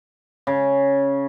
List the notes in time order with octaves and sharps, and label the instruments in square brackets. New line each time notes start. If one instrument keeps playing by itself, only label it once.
[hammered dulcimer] C#3